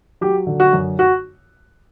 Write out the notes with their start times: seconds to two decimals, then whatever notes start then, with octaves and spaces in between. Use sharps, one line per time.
0.21 F#3 G4
0.47 D3
0.60 F#4
0.73 F#2
0.99 F#4